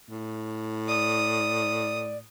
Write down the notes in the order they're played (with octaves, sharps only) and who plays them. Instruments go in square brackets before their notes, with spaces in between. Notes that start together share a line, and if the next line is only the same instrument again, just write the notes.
[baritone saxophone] A2
[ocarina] D5 [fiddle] D#6